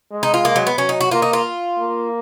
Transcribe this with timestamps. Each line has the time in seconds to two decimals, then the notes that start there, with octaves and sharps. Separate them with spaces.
0.11 G#3
0.23 D#4
0.34 F4
0.45 A#3
0.56 F#3
0.67 B3
0.78 F#3 C#4
0.89 D#4
1.01 F#4
1.11 A#3 F4
1.22 D#4
1.33 F4
1.79 A#3